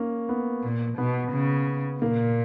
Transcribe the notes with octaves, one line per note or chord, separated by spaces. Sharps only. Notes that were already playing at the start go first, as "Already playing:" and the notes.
Already playing: A#3 C#4
B3
A#2
B2 B3
C#3
A#2 A#3